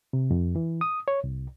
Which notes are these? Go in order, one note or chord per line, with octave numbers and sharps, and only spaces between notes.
C3
F2
E3
D#6
C#5
C2